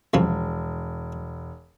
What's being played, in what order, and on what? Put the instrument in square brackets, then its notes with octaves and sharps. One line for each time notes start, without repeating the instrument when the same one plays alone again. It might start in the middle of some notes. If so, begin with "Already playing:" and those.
[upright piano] E1 [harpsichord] C2 C#3 F3